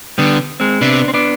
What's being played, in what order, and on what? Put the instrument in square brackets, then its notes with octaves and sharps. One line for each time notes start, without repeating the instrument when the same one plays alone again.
[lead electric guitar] D3 [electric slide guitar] G3 B3
[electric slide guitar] G#3 C4
[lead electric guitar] C3 [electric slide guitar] B3 D4
[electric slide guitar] C4
B3 D4